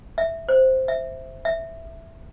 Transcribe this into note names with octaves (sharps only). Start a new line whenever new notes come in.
E5
C5
E5
E5